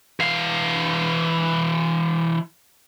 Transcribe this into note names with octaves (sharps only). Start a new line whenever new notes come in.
E3 F5